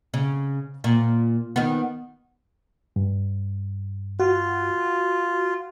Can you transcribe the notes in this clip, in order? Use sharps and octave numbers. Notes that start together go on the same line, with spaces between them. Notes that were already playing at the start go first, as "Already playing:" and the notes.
C#3
A#2
D#3 B3
G2
F4 F#4